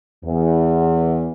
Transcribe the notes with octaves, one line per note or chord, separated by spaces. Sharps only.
E2